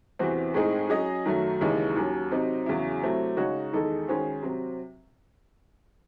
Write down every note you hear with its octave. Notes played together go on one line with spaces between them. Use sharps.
E2 C3 E3 C4 F#4
A2 G#3 C4 D#4 G#4
F#3 C#4 G#4 D#5
F#2 D#3 F#3 A3
D#2 C#3 E3 G#3 D#4
D#2 D#3 F#3 C#4
C3 F#3 C4 D#4
E2 C#3 F#3 C#4 E4
C3 F#3 A3 C4 E4
C#3 G#3 D#4 F#4 C#5
E2 D#3 G#3 D#4 A4
D#3 G#3 C#4 F#4 C5
C3 F#3 C4